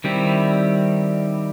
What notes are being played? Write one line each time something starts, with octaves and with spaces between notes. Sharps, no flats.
D#3 G3 C4 E4 G4